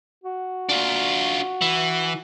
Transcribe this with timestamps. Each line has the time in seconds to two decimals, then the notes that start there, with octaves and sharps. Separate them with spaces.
0.24 F#4
0.69 D4 F4
1.61 E3